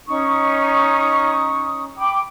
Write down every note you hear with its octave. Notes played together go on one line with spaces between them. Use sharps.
C#4 D#4 C#6 D#6
G5 B5 D6